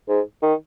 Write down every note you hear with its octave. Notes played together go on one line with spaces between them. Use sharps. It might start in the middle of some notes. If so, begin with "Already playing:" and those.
G#2
D#3